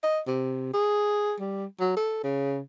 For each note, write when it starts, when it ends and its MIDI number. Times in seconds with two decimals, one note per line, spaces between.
0.04 0.20 75
0.27 0.70 48
0.74 1.35 68
1.40 1.66 55
1.80 1.93 54
1.96 2.21 69
2.24 2.59 49